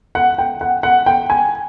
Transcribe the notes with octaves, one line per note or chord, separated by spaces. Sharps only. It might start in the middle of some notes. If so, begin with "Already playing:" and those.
F#5
G5
F#5
F#5
G5
G#5